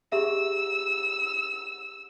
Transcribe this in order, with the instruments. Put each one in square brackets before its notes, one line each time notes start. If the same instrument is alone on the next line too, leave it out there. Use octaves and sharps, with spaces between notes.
[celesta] G4 G#4 E5 [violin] E6